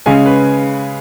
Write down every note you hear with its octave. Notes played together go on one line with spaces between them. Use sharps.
C#3 G#3 C#4 G#5
B4